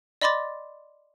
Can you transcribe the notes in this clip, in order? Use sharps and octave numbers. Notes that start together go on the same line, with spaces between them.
D5 D#5 B5 C6 D6 A6